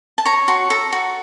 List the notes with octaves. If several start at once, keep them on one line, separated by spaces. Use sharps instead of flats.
A5
C#5 A#5
F#4 C6
A4 A#5
F#4